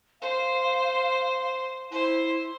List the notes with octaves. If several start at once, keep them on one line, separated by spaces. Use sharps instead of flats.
C5 F5
E4 C5